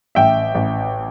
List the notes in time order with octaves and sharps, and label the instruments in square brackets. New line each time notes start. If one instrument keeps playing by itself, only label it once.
[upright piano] A1 E5 G5
A1